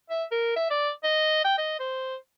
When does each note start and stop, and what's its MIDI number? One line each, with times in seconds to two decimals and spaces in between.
0.10 0.24 76
0.32 0.53 70
0.56 0.70 76
0.71 0.91 74
1.04 1.42 75
1.44 1.57 79
1.58 1.77 75
1.80 2.16 72